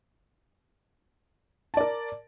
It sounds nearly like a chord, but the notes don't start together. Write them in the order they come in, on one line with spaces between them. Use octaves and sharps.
A5 D5 A#4